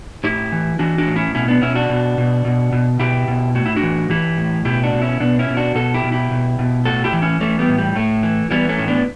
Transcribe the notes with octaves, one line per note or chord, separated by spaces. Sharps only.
A2 E4 G4
E3
E3 D4 F#4
D4 F#4
A2
C#4 E4
B2 C#4 E4
B3 D4
B2 C#4 E4
D4 F#4
B2
B2
B2
B2
B2 E4 G4
B2
A2 F#4
E4
D4 F#4
E3
E3 E4 G4
A2
B2 E4 G4
D4 F#4
B2
C#4 E4
B2 B3 D4
C#4 E4
B2
D4 F#4
B2 F#4 A4
E4 G4
B2
E4 G4
B2
B2
A2 F#4 A4
E4 G4
E3
C#4 E4
E3 A3 C#4
G3 B3
A2
G3
A2 A3
E3
E3 G3 B3
A3 C#4
A2
B3 D4